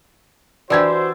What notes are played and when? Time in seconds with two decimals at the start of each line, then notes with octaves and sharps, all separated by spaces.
0.70 E3 D4 F#4 G4 C5 D5 E6 G#6